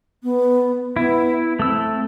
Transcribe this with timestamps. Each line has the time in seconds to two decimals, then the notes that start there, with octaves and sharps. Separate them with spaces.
0.23 B3
0.96 B3 E4
1.59 A3 C4 E6